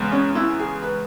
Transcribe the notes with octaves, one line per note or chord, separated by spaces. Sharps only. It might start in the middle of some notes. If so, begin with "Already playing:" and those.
Already playing: E2 C#3 G#3 B3
C#4
E4
G#4
B4